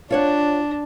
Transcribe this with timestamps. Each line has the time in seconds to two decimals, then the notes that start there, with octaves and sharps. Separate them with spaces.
0.11 D4 F4 C#5 F#5